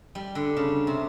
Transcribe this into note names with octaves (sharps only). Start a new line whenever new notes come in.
G3
D3
C#3
C3